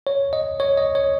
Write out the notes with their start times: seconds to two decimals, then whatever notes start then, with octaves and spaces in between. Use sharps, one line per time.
0.07 C#5
0.33 D#5
0.60 C#5
0.78 D#5
0.95 C#5